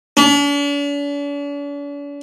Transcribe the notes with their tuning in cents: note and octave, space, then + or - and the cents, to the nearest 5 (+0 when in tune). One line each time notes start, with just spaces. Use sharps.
D4 -45